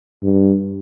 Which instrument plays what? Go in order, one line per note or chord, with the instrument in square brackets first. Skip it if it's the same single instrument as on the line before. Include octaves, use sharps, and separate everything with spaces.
[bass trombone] G2